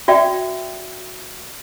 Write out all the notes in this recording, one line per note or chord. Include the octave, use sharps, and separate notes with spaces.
F#4 D5 E5 G5